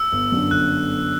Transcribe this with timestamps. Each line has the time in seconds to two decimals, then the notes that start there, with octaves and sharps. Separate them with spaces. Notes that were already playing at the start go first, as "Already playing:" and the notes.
Already playing: E6
0.12 G1
0.32 F#2 D3
0.51 G1 F#6